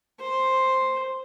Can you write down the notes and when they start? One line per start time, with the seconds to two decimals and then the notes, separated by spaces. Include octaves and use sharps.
0.20 C5